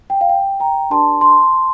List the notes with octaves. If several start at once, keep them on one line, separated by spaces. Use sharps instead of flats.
G5
F5
G5
G5 A#5
D4 G4 A#4 D5 A5 C6
A5 C6